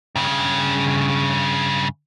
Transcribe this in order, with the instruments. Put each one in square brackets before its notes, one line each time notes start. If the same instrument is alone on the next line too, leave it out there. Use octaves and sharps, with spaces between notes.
[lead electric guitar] G2 C#3